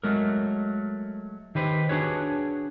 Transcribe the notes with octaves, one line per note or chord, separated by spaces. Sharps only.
F#3 G#3 A3 A#4
D#3 G4 B4 C5
D4 F#4 G#4 B4 C#5